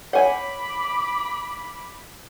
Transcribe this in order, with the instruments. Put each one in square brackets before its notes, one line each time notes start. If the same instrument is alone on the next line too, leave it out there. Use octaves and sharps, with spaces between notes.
[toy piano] C#5 [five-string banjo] F#5 G#5 [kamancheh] B5 D6